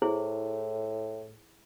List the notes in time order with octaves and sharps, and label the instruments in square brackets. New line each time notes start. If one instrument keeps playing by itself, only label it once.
[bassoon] A2 [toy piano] E4 G#4 C5